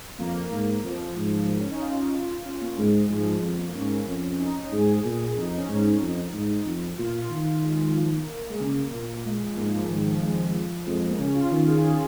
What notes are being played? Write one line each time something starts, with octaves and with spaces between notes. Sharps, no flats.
F2 A#3
G#2
F2 F3
G#2
A#3
C#4
D#4
F4
C#4
A#3
G#2 G#3
G#2 F3
F2
A#3
G#2 C#4
F2
D#4
D#4
G#2 G#4
A#2
F2 D#4
D#4
C#4
G#2 D#4
F2
G#2
F2
A#2 F4
F4
D#3
G#3
F3
F3
A#3
G#3
C#3 A#3
A#2
G#3
F3
G#2 A#3
F3
G#2 D#3
F3
F2 G#3
F3
F2 G#3
G#3
A#3
C#3 C#4
F4
D#3 F4
G#4